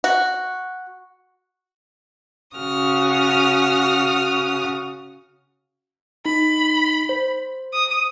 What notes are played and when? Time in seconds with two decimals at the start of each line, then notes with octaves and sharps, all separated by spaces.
0.04 F#4
2.56 C#3 F#4 D#6 F6
6.26 D#4 B5
7.09 C5
7.74 D#6